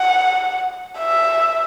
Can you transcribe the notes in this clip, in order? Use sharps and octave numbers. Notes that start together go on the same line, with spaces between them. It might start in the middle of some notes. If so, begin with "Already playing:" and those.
Already playing: F#5
E5